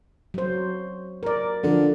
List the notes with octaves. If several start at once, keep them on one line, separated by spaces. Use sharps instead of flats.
F#3 C5
A#4 D5
D3 F3 D4